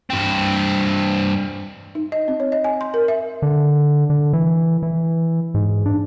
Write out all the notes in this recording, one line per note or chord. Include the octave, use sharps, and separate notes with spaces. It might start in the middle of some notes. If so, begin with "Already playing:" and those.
G2 C4
D#4
D#5
C4
C#5
D#5
G#5
C6
A#4
E5
D3
D3
E3
E3
G#2
D4